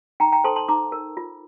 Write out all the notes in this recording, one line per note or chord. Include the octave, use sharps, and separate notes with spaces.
D#4 G5 A#5
G5 A#5
A4 C5 A5 C6
A5 C6
D#4 A#5 D6
A#4
F4